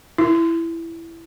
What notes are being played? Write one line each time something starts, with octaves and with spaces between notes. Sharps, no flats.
E4